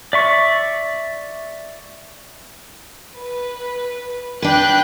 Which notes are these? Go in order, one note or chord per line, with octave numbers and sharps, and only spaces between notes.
D5 E5 C#6
B4
D4 B4 G5 F#6 G6